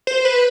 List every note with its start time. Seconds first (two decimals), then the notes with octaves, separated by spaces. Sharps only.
0.07 C5
0.25 B4